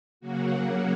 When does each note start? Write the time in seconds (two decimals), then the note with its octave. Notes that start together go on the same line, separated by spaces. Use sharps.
0.20 C#3 F#3 A#3 F#4
0.54 F#4